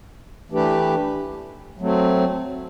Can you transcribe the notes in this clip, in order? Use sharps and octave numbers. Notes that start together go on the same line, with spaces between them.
E3 A3 D4 G4 B4
F#3 A3 C4